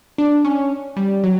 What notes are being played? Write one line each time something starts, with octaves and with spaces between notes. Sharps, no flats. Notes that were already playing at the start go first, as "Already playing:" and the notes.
D4
C#4
G3
F#3